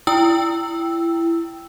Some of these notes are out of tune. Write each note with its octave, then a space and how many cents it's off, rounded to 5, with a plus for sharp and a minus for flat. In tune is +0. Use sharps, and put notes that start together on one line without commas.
E4 +25 G5 +0 E6 +0